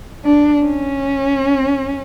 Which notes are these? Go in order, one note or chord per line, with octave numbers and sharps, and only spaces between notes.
D4
C#4